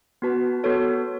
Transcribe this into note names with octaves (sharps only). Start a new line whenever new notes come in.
B3 F#4 B4 A5
B3 F#4 A4 C#5